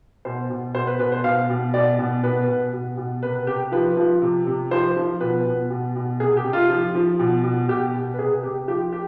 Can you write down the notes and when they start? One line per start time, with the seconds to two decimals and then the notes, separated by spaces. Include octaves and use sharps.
0.25 B2 C5
0.50 B2
0.75 B2 C5
0.87 B4
0.99 B2 B4
1.12 C5
1.24 B2 F5
1.50 B2
1.74 B2 D5
1.99 B2
2.23 B2 B4
2.48 B2
2.73 B2
2.97 B2
3.22 C3 B4
3.47 C3 G4
3.72 F3 B4
3.97 F3
4.22 C3
4.47 C3
4.71 F3 C5
4.96 F3
5.20 B2 B4
5.45 B2
5.70 B2
5.96 B2
6.20 C3 G#4
6.37 G4
6.45 C3
6.53 F4
6.70 F3
6.95 F3
7.19 B2
7.44 B2
7.68 B2 G4
7.94 B2
8.14 B4
8.19 C3 G#4
8.43 C3 G4
8.68 F3 G4
8.92 G4